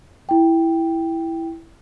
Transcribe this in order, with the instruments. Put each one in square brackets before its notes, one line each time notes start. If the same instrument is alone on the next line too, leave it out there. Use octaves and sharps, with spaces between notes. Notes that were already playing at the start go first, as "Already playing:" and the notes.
[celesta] E4 G5